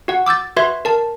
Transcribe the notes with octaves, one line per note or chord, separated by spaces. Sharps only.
F#4 F#5
D6 E6 G6 A6
F#4 B4 E5 C6 G#6
A#4 A5